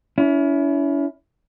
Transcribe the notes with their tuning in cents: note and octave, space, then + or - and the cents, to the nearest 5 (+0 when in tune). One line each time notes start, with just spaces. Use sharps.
C#4 +35 E4 +0